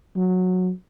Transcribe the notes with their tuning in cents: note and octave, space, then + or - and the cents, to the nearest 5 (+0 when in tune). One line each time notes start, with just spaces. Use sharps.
F#3 -15